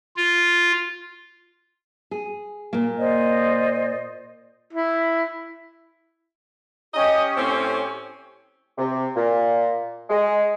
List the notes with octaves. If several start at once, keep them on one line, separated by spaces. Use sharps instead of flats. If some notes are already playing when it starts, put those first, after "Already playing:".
F4
G#4
A#2 A#3
C5 D5 D#5
E4
C#4 G4 D#5
A2 C4
C3
A#2
G#3